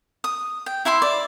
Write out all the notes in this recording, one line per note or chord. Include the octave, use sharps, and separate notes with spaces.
D#6
G5
E4 E5 B5 C6
D5